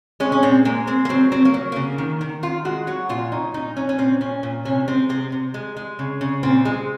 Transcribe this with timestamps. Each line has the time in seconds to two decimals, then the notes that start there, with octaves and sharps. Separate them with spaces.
0.20 G#3 C#4
0.32 C#4
0.43 A#2 C4
0.65 G#3 A#3
0.87 G#3 C4
1.05 A#3
1.09 F#3 C4
1.32 F#3 C4
1.45 A#3
1.54 F#3
1.72 C#3 A#3
1.98 D#3
2.21 D#3
2.43 D#3 F4
2.65 G#3 F#4
2.87 F#3 F#4
3.09 A#2 F4
3.32 F#3 D#4
3.54 A#2 D#4
3.77 F#3 C#4
3.89 C#4
3.98 A#2 C4
4.21 A#2 C#4
4.43 A#2
4.65 C3 C#4
4.88 G#3 C4
5.09 C3 C4
5.32 C3
5.54 G#3
5.77 G#3
5.99 C#3
6.21 C#3
6.43 A#2 C4
6.65 G#3